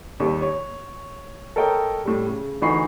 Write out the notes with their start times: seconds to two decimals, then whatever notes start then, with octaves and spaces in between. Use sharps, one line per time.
0.20 D#2 G3
0.42 C#5
1.56 A4 A#4 C#5 D#5 G5
2.05 A2 G3
2.27 C#3
2.62 D2 E3 D#4 B5 C#6 C7